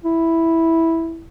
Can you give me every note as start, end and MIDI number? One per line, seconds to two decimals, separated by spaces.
0.04 1.25 64